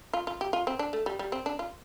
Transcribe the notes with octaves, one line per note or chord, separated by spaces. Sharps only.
F4
F4
G4
F4
C4
D4
A3
G3
G3
C4
D4
F4